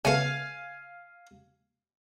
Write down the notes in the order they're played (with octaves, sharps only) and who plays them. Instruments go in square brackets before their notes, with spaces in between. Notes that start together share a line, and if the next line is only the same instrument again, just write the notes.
[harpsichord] C#3 A3 B3 [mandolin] F5 G#5